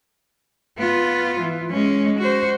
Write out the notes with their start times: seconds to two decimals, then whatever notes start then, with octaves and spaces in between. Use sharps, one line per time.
0.79 B3 F4
1.40 E3
1.71 G#3 C#4
2.19 F#4 C5